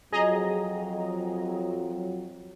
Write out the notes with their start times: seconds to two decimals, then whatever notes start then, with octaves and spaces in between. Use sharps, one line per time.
0.12 F2 F#3 G#4 D#5 A#5